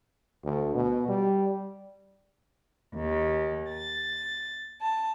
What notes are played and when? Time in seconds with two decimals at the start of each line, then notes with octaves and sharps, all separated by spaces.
0.44 D2
0.74 B2
1.08 G3
2.94 D#2
3.69 A6
4.81 A5